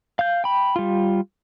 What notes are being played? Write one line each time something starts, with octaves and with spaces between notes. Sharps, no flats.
F5 G6
G5 B5
G3 F4